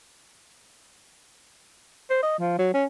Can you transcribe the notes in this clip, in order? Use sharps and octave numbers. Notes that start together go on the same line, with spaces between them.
C5
D#5
F3
F#3
C#4